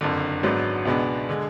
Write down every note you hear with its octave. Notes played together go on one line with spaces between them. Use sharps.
F#1 F2 D3
G#1 G#2 F#3 B3 D4
C#2 B2 G#3 B3 D4
D3 G#3